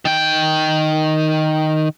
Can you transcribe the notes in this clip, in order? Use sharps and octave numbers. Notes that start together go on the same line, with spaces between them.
D#3 G5